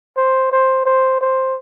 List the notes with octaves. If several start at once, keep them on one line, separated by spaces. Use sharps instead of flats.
C5
C5
C5
C5